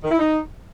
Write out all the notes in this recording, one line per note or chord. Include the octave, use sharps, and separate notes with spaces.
D#3
E4
D#4